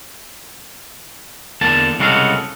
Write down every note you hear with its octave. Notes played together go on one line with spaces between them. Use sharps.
E2 D3 A#3 A5
C2 C#3 G#3 F#4 A4 F5